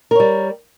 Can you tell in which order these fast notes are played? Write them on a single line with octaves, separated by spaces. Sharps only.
A#4 C#5 G3